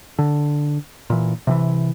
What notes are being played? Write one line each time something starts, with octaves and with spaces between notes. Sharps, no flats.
D3
A#2 E3
C3 D#3 E3